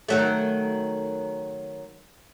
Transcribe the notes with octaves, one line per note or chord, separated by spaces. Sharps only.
D#3 F#3 A3